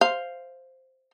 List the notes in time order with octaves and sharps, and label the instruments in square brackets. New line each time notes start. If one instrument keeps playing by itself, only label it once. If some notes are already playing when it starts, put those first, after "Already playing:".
[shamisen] C5 F5